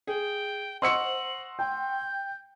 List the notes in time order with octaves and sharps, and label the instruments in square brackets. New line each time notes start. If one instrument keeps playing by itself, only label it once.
[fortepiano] G#4 [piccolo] G5
[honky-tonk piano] C5 [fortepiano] D#5 F#5 C#6 [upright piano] C6 E6 C#7 [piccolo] F#7
[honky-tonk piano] G5 [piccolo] G6